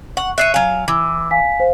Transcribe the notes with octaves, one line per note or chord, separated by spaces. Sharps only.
F#5 C#6
C#5 D5 E5 F#6 C7 D#7
F#3 F5 G#5
E3 D6 E6
F5 G#5 B6
C5 F5